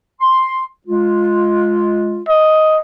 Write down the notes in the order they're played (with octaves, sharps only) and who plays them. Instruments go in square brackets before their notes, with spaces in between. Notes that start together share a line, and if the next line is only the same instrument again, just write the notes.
[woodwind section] C6
G#3 F4
[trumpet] D#5